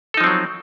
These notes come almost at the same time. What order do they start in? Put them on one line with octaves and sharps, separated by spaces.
A4 D#4 F3 C4 F#3